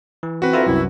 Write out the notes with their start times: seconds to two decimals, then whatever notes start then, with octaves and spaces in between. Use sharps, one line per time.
0.23 E3
0.42 C4 F#4 B4
0.53 D2 E4 F4 A#4 E5
0.67 C2 F#2 E4